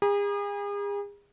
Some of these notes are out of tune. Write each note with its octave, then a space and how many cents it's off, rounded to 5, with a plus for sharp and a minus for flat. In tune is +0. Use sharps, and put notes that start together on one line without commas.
G#4 -40 A#5 +45